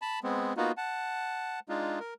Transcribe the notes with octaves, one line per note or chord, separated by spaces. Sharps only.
A5 B5
G#3 B3 C4
A#3 B3 D#4 F4 F#4
F#5 A5
G#3 D4 D#4 F4
A#4